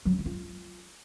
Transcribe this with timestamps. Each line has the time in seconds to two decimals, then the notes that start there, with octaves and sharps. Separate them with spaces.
0.05 F#3
0.12 C#4
0.19 E4
0.26 F4